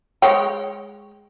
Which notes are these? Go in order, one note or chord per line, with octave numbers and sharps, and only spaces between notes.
G#3 C#5 G5